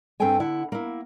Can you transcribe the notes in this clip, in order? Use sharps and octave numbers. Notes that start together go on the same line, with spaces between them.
G2 C4 A4 B4 G5 G#5
D3 E4 F#5
A#3 E4